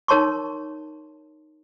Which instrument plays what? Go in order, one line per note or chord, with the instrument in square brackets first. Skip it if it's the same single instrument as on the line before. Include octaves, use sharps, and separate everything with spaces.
[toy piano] D#4 A#4 C#5 A5 C6 C#6